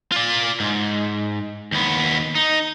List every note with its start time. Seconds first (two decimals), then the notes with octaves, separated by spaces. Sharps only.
0.12 F4 D5
0.60 G#2
1.72 D#2 B3
2.35 D#4